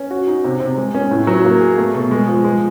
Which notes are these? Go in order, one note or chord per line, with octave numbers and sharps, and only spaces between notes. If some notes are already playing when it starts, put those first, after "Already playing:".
Already playing: C#4
F#4
D#4
C3
C3
G#3
C#4
A2
F#3
A#3
G#4
A3
B2
G#3
F3
G#3